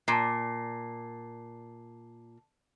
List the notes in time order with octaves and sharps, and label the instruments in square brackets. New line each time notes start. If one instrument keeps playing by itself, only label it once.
[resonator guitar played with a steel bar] A#2 [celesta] A5 C7